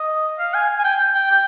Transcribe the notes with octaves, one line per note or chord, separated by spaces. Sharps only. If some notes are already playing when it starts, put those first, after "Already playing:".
Already playing: D#5
F5
G#5
G#5
G5
G5
G5